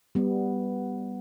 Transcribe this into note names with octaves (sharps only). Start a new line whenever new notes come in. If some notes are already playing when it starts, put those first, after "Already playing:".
G3 B3